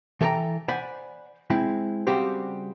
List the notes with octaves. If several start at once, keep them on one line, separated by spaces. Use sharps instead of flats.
E3 A4 C#5 D5 G5 A#5
C5 D5 F#5 G#5 B5
G#3 C4 E4
C#3 G3 C4 F#4 G4 C5